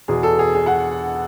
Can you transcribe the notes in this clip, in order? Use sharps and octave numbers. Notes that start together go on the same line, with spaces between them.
E2 B2 G#4
A4
G#4
G#4
F#5